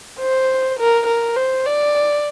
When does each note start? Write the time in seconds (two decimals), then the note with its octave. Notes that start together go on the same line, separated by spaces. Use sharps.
0.19 C5
0.79 A#4
1.07 A#4
1.36 C5
1.66 D5